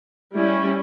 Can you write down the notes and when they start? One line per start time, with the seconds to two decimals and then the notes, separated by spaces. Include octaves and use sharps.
0.34 G3 C#4 E4